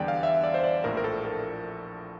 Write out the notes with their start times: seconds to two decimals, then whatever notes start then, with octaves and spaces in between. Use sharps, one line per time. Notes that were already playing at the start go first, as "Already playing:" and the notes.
Already playing: E2 D3 G3 D5 G5
0.08 F5
0.23 E5
0.44 D5
0.54 C5
0.64 D5
0.84 A#1 A2 F3 A#4
0.97 A#4
1.04 A4
1.25 A4